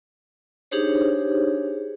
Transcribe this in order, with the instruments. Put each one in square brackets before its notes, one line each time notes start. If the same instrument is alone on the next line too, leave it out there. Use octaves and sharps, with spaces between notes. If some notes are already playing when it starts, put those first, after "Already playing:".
[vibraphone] D4 D#4 G4 G#4 C5 C#5